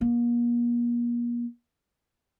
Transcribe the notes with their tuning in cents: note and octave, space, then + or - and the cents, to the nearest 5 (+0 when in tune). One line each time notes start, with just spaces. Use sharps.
A#3 +40